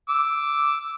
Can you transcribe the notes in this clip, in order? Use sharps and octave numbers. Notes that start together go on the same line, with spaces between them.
D6 E6